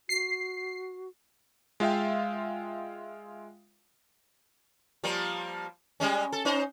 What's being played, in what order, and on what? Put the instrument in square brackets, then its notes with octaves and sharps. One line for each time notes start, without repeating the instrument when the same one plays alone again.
[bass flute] F#4 [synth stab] C7
[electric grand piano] G#3 F4 E5 F5 G5
[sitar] F3 G3 A#3
G3 G#3 C#4
A4
C#4 D#4 C5